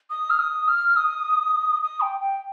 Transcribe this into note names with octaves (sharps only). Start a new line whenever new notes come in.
D#6
F6
D#6
F6
D#6
D#6
G5
G5